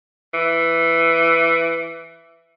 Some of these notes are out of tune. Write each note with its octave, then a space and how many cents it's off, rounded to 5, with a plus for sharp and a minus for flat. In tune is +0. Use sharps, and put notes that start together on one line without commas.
E3 +10